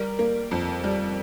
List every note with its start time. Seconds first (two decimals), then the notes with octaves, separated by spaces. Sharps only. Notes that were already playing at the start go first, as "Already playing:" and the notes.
Already playing: G3 A#4
0.19 A#3
0.51 F2
0.84 G3